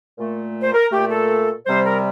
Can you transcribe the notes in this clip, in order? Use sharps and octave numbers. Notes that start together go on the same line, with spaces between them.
A#2 A3
C5
A#4
A#2 A3 G4
A4
C3 G3 C5
A#4